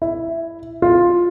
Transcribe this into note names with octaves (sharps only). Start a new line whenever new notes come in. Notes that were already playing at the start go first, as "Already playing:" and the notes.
E4
F4